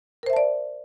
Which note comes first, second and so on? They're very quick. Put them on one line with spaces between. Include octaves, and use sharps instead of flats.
A#4 C5 E5 A5 D5